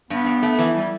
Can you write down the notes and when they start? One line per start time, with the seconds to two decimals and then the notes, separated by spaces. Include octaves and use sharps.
0.10 G2 B3
0.26 G2
0.43 A3
0.59 E3
0.75 G3